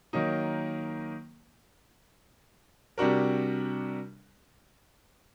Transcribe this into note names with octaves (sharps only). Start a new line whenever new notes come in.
D#3 F#3 A#3 D#4
C3 G3 D4 F#4 A#4